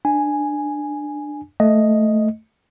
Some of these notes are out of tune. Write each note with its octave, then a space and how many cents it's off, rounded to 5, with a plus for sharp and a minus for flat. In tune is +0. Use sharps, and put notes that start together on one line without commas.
D4 +15 G#5 +0
A3 +0 D#5 +0